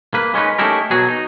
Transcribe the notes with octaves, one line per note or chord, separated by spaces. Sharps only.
A#3 B4
G#3 C#4 D#4 B4
A3 C#4 D#4 E4 G4 A#4
B2 F#3 F#4 G#4
D#4